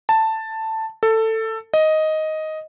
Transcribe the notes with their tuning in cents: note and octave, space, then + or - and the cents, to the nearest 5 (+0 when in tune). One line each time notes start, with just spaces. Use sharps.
A5 +10
A4 +15
D#5 +5